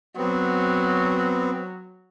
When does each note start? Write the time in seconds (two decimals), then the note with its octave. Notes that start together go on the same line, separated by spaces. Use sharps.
0.17 F#3 B3 C4